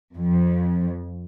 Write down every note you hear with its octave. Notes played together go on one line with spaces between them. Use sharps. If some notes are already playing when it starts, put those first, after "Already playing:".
F2